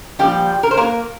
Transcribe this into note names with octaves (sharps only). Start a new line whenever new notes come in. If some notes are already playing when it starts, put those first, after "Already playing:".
A#2 F3 G3 G4
A#4
C5
A#3 A#4